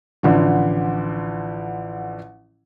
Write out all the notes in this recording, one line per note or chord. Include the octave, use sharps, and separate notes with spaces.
A1 D3 F3